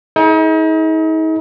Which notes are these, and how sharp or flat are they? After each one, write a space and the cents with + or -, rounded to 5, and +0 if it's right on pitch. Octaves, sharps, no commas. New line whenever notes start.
D#4 +40 G#4 +35